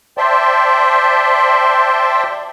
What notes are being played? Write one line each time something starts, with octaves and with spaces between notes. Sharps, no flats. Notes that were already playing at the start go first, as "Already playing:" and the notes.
C5 D5 E5 G5 A5 C6